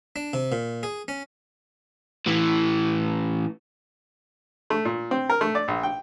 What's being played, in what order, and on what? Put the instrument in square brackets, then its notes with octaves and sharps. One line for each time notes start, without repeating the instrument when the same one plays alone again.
[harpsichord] D4
C3
A#2
G#4
C#4
[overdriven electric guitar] A2 E3
[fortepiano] A3
A#2
C4
A#4
A3
D5
A#1
G5